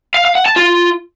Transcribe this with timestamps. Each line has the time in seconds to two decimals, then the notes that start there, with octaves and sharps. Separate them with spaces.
0.14 F5
0.25 F5
0.35 F#5
0.46 A5
0.56 F4